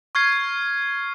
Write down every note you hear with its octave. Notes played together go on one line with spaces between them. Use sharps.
C#6 F6 G#6 C7